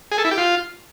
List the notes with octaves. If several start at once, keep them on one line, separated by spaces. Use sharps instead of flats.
G#4
A4
E4
G4
F4